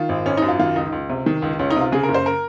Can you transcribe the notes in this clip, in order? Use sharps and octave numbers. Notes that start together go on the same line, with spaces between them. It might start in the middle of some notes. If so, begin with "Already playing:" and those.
Already playing: D#3 F4
G#1
G#1 C#4
F#2 D#4
F4
D#3 F4
C#2 D#4
C#2
C3
D#3
C#2
C#2 C#4
D#4
C3 F4
C#3 G#4
A#4
F#1
C5
A#4